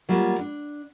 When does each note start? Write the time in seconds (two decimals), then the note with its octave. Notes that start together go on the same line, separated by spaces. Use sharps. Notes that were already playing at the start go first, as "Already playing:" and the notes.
0.09 F#3 G3 A#3 F4
0.39 D4